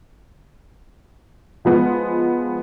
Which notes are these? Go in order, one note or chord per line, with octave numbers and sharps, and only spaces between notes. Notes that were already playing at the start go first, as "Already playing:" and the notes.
F3 G#3 B3 F4